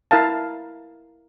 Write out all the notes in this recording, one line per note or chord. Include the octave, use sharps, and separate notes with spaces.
E4 A#4 F5 A5